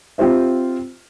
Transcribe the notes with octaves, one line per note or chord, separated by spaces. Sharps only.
C4 F4 G4 C5 E5